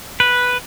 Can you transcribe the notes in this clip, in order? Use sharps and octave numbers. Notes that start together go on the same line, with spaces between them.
B4